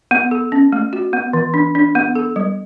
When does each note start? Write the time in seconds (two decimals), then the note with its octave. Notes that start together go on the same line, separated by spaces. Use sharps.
0.11 B3
0.31 A4
0.52 C#4
0.72 A3
0.93 F#4
1.13 B3
1.33 E3
1.54 D4
1.75 D4
1.95 B3
2.15 A4
2.36 G3